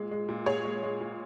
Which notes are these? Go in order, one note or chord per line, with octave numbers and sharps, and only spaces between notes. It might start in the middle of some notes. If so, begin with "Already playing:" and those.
Already playing: A#2 G#3
G#3
A#2
A#2 G#4 C#5
G#3
G#3
A#2